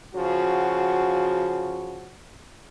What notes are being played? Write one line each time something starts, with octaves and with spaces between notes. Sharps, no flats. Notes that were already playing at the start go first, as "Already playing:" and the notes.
C#3 F3 F#4